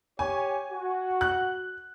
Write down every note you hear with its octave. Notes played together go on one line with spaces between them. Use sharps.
G4 C#5 G#5
F#4
F#6